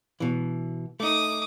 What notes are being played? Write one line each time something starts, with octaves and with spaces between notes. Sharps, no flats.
B2 E3
A3 D#4 D6 D#6